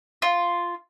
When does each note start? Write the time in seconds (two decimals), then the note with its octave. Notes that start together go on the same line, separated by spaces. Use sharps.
0.22 F4